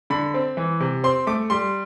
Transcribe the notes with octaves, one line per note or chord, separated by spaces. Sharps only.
D3 B5
C4
E3
C3
C4 C6
A3 D6
G3 C6